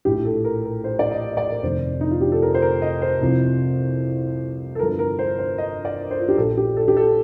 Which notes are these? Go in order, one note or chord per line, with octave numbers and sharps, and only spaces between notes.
A#1 A2 F3 G4
A4
A#4
A#4
C5
D5
D#5
D#5
D5
A#4
F1 F2 D#3 C5
D#4
F4
G4
A4
A#4
C5
A#4
D#5
C5
C2 C3 F3
A4
G1 G2 F3 A#4
A#4
C5
C5
D#5
D5
C5
F4
G4
A#1 A#2 F3 A4
G4
A4
G4
A4